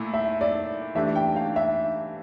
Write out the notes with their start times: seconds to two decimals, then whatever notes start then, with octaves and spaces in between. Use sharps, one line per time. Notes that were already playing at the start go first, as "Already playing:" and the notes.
Already playing: A#2 A3 E4
0.14 E5
0.41 D5
0.95 E3 A3 D4 G4 E5
1.16 G5
1.36 F5
1.56 E5